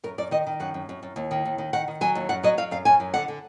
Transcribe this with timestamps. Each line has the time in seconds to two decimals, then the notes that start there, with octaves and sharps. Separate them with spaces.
0.04 F#2 A#4
0.18 F#2 D5
0.31 D#3 D#5
0.47 D#3
0.60 F#2 F#5
0.74 F#2
0.89 F#2
1.03 F#2
1.16 D#2
1.31 D#3
1.45 D#2
1.58 D#3
1.73 D#3 F#5
1.88 D#3
2.01 F#3 G#5
2.15 D#2
2.29 F#2 F#5
2.43 F#3 D#5
2.58 F#3 F5
2.71 F#2 F5
2.85 F#2 G#5
3.00 F#2
3.14 D3 F#5
3.28 D3